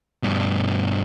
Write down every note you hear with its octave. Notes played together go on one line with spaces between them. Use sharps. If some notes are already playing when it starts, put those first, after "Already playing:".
G2 B2